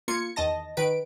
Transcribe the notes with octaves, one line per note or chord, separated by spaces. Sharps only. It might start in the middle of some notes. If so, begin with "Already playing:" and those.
A#3 F4 G#6 C#7
E2 D#3 D#5 A5 A#6
D#3 B4 D7